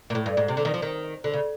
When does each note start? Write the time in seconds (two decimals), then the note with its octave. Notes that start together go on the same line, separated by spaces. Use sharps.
0.10 A#2
0.15 A2
0.26 G2
0.37 G#2
0.48 C3
0.57 D3
0.65 D#3
0.74 F3
0.82 D#3
1.24 D3
1.33 C#3